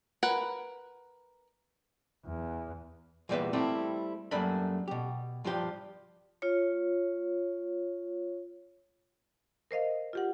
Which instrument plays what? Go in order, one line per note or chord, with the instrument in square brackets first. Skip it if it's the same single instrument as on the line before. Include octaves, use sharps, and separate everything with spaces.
[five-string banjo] A#4 B4 F#5
[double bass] E2
[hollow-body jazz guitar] E2 A#2 G3 D#4 B4 E5
G3 A3 C4 E4 G4
F#2 G3 A3 A#3 D4 B5
B2 G4
G2 F3 D4 G4
[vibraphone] F4 C#5
[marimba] A#4 C5 D#5 F5
F4 G4 F#5